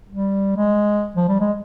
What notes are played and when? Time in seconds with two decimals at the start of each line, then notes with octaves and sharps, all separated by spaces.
0.09 G3
0.57 G#3
1.16 F3
1.28 G3
1.40 G#3